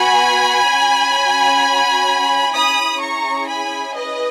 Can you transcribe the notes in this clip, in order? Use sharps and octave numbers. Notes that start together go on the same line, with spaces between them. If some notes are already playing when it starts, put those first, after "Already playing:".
Already playing: B3 F#4 G#5 B5
C#4 F#4
C#4 E4 G#4 B5 D#6
A#5 C#6
G#5 B5
B4 D#5